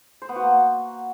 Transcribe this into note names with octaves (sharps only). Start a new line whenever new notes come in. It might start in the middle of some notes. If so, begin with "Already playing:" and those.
C5
B3
F#4
A#3